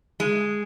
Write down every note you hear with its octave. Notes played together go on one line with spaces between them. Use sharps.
G#3